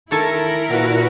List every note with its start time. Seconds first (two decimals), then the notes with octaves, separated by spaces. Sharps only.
0.11 D#3 E4 A4 A#4 G#5
0.69 A#2 F#4 B4